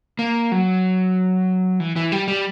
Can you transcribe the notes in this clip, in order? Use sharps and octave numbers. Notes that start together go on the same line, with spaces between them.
A#3
F#3
E3
E3
G3
G3